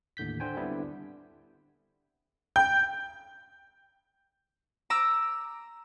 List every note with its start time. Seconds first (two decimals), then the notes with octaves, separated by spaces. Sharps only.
0.17 D#2 A2 D3 G6 B6
0.40 D3 C5 G5 G#5
0.57 D3 G3 B3 C4 D4 E4
2.56 G5 G6
4.90 A#5 D6 E6